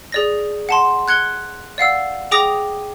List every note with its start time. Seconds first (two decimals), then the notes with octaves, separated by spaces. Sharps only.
0.12 G#4 D5 A#6
0.69 F#5 A5 C6
1.08 F#6 G#6 C#7 G7
1.78 D5 F5 F#5 E6
2.31 G#4 G5 D6 D#6 A#6 F7